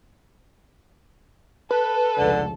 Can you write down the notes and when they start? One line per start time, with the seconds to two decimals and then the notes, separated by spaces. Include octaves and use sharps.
1.71 A4 B4
2.18 F1 C#2 D3